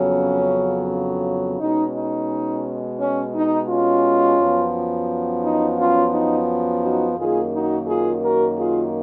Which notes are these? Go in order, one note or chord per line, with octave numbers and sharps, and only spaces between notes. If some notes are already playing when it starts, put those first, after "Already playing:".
Already playing: F2 C#3 F#3 B3 C#4
B2 G#3 C#4 D#4
D#4
C#4
D#4
C#4 F4
F#2 F3 B3
D#4
C#4 F4
D#4
D#4 F#4
F#2 D#3 A#3 F4 G#4
D#4 F#4
F4 G#4
F#4 A#4
F4 G#4